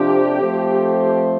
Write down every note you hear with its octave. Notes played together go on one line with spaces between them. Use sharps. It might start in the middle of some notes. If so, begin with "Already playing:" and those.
Already playing: F2 C3 F3 D4 G4
F3 A3 C4 A4 C5